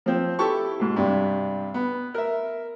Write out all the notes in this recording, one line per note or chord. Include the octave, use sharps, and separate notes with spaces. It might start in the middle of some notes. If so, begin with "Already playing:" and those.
F3 C4
E4 G4 A4 A5 C#6
G#2 B2
G2 C3 D4
B3
A#4 E5